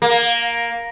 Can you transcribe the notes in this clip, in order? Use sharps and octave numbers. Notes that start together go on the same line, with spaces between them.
A#3